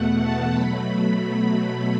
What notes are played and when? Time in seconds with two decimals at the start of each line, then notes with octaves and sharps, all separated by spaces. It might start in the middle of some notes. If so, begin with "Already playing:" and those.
Already playing: E2 B2 A3 F#5
0.22 A5
0.54 B2 F#3 A3 B5